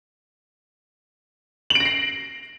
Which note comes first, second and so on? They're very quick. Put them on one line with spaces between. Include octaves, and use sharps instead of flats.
F#7 D7 A#6 C7